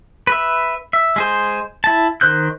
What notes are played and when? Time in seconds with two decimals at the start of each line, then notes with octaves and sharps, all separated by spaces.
0.27 B4 E5
0.93 E5
1.16 G#3 G#4 C5
1.84 E4 A5
2.21 D#3 C5 F#6 G6